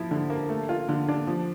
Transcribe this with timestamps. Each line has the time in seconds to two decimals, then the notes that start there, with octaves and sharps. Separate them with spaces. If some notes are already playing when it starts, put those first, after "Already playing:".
Already playing: F3 E4
0.11 D3
0.30 A#3
0.49 A3
0.69 F4
0.89 D3
1.09 D4
1.27 F3